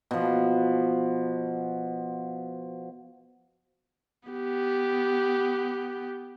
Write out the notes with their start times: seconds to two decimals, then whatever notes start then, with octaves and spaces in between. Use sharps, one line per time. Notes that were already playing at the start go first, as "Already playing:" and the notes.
0.11 B2 F3
4.30 B3 G4